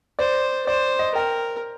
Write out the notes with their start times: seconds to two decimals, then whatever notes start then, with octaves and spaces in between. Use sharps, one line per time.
0.19 C5 D5
0.67 C5 D5
0.99 D#5
1.15 A#4 G5